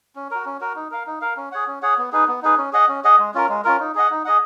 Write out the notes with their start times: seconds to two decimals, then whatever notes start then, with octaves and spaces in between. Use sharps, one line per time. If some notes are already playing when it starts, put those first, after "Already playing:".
0.16 C#4
0.31 F#4 A#4
0.45 C#4
0.61 F#4 A#4
0.76 D#4
0.91 A#4 F5
1.07 D#4
1.21 A#4 F5
1.37 C#4
1.52 G#4 C#5 F#5
1.67 C#4
1.82 G#4 C#5 F#5
1.98 B3
2.12 D#4 G#4 B4
2.28 B3
2.42 D#4 G#4 B4
2.58 C#4
2.73 G#4 D#5 F#5
2.88 C#4
3.04 G#4 D#5 F#5
3.19 G#3
3.34 C#4 F4 A#4
3.49 G#3
3.64 C#4 F4 A#4
3.80 D#4
3.95 G#4 D#5 F#5
4.10 D#4
4.25 G#4 D#5 F#5